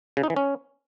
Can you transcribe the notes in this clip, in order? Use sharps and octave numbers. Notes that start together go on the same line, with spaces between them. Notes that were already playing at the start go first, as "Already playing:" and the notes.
C#3
D#4
E3
C#4